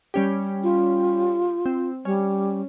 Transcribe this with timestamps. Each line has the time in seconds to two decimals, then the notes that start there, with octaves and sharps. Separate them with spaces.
0.14 G3 C#4 G4
0.63 F4
1.66 C4
2.05 G3 C#4